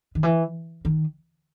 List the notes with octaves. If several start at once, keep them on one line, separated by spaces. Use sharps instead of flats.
D#3
E3
D#3